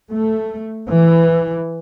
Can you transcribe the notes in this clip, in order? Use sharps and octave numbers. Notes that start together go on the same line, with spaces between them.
A3
E3